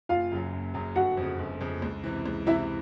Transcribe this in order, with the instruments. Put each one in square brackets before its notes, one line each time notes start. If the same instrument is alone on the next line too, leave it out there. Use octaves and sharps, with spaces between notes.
[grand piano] F#1 [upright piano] F4 F5
[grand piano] F#2 C#3 F#3
F#1
F#2 C#3 F#3
[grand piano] G1 [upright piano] F#4 F#5
[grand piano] F2
C#3
G1
F2 C#3
C#2
C3 E3
C#2
[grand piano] C3 E3 [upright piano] E4 E5